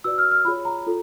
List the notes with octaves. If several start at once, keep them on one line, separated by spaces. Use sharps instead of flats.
F#4 B4 D5 E6
F6
F6
F4 G#4 C#5 B5
A#5
F4 A4